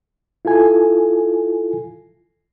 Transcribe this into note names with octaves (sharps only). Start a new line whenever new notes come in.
E4 F4 A4 G#5